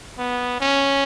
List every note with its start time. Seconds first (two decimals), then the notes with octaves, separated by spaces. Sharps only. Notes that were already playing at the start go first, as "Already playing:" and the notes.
0.18 B3
0.61 C#4